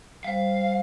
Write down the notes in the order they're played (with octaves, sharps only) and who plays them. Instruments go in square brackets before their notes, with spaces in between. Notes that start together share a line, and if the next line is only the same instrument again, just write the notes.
[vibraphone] G3 C5 [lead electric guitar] F5